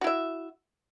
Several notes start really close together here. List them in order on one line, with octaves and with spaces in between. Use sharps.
F#4 E4 E5